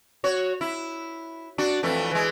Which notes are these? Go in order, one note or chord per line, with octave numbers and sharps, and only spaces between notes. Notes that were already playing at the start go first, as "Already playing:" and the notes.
F#4 C#5
E4
D4 F#4
F2 E3 A3
E3 G#3